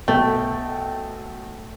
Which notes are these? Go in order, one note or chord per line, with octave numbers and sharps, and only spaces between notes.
B1 A3 A4 G5